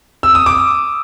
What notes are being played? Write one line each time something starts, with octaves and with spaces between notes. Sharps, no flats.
E6
D#6
D6